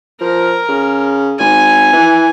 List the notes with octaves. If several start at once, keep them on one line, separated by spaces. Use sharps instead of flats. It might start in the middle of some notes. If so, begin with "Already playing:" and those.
F3 A#4
C#3
G#1 G#5
E3